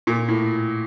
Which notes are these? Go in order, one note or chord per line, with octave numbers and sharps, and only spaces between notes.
A#2
A2